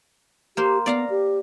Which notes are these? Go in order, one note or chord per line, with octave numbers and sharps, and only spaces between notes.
A#3 G4 C5
B3 D5 F5 A#5
G4